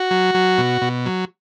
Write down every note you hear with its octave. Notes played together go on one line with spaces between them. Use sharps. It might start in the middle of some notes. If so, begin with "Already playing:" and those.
Already playing: F#4
F#3
F#3
B2
B2
F#3